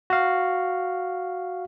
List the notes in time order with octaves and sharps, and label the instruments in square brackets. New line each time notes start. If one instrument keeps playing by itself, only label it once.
[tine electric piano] F#4 F5